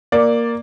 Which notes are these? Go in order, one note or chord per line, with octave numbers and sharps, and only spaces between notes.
A#3 D5